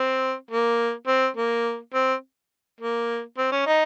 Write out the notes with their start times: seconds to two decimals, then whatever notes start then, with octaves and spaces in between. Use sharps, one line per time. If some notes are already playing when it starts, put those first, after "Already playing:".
Already playing: C4
0.51 A#3
1.07 C4
1.37 A#3
1.94 C4
2.80 A#3
3.38 C4
3.52 C#4
3.67 D#4